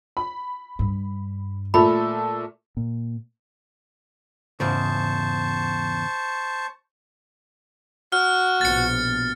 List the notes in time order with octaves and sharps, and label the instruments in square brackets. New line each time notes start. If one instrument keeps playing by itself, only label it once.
[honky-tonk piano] B5
[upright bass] G2
[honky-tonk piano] A#2 A3 A4 [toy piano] B5
[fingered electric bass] A#2
[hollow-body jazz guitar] E2 G#2 C#3 [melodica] C5 A5 C#6
[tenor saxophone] F#4 [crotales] F6
[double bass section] A#1 B2 [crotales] A6 C#7